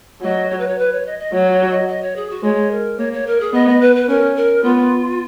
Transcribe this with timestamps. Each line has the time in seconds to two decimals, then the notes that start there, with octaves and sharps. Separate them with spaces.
0.22 F#3 D#5
0.49 C#5
0.59 B4
0.67 C#5
0.78 B4
0.92 C#5
1.05 D#5
1.18 D#5
1.33 F#3 C#5
1.51 C#5
1.70 D#5
1.87 D#5
2.02 C#5
2.16 G#4
2.30 F#4
2.43 G#3 C#5
2.71 A#4
2.98 A#3 C#5
3.12 C#5
3.26 A#4
3.40 G#4
3.53 B3 D#5
3.68 D#5
3.80 B4
3.95 B4
4.08 C#4 A#4
4.36 A#4
4.63 B3 F4